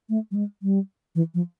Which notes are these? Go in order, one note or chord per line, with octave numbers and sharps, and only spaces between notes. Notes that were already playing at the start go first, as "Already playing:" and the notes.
A3
G3
G#3
G3
E3
F3